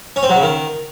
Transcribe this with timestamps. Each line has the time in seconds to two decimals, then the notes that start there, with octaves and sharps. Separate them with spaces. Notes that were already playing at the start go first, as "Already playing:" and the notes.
0.16 C#4
0.23 C4
0.30 F#3
0.36 C#3
0.43 D#3